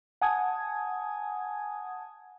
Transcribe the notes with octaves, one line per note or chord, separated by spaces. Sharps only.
F#5 G#5 A5 D#6 G#6